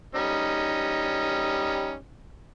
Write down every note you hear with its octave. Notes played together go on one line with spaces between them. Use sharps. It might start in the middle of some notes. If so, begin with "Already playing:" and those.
G3 C#4 D#4